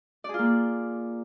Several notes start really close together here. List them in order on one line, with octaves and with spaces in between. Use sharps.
D5 G#4 F4 A#3